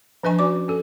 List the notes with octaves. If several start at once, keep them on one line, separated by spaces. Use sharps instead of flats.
F3 D4 B4 D#5 G#5 C#6
C#4 F#4 D5 D6
C#4 A4